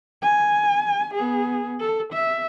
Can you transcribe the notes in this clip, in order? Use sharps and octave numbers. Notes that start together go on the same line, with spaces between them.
G#5
B3 G#4
A4
E5